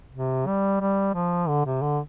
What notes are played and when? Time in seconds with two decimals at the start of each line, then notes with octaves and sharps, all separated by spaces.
0.12 C3
0.46 G3
0.81 G3
1.14 F3
1.48 D3
1.66 C3
1.82 D3